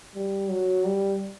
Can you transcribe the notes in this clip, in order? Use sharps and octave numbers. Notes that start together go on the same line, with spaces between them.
G3
F#3
G3